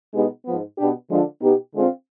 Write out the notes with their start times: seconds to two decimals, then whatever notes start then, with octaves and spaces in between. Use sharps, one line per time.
0.13 B2 G#3 B3 D#4 G4
0.44 G#2 F3 B3
0.77 B2 B3 D4 G4
1.09 D3 F3 G#3 D4 F4
1.40 B2 B3 D#4 G4
1.73 D3 G#3 C4 F4